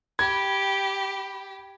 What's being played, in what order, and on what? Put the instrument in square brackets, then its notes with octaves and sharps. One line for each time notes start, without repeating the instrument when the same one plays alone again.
[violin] G4 [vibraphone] B5 [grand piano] G#6